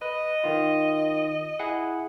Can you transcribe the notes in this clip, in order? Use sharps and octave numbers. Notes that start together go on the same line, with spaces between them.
B4 D#5
D#3 F4
E4 G#4 F#5